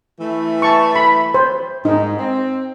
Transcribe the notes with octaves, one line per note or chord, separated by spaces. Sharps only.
E3 A3
A5 C#6
B5
C5
G#2 D#4
C4